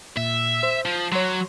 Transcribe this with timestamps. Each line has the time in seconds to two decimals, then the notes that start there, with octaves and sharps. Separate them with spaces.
0.17 A#2 E5
0.63 C5
0.85 F3
1.12 F#3 C#5 C6